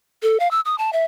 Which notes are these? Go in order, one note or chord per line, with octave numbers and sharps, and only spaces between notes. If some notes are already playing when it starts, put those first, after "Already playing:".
A4
F5
E6
D#6
A5
E5